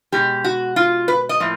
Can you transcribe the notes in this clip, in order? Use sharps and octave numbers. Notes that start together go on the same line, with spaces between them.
B2 G#3 G4
F#4
F4
B4
D#5
A2 F3 A#3